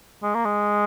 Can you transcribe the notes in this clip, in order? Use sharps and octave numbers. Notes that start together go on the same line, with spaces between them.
G#3
A#3
G#3